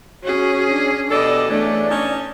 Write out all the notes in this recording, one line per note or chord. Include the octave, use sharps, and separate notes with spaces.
C#4 F#4 G#4
D4
B2 G4 A4 D5 D#5
E2 A3 C#4 D4 D5
C#4 D#4 A5